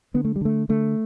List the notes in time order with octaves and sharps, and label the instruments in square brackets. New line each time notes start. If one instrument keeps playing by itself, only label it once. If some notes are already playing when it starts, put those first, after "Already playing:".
[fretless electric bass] D3 B3
A3
G3
D3 A3
D3 A3